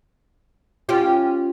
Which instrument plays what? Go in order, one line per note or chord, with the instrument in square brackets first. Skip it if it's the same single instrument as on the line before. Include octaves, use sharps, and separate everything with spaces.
[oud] C#4 F4 G4